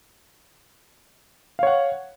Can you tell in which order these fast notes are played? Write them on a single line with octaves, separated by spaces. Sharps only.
F5 C#5 F#5